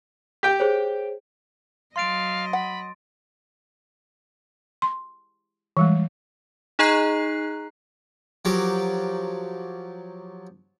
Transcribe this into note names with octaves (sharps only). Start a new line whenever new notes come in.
G4 G5
G#4 C5 C#5
F#3 D#5 F5 C6 A6 D7
F#5 B5
C6
E3 G3 G#3
D#4 G#4 D#5 A#5 F#6 C7
F3 F#3 G4 A#4 D6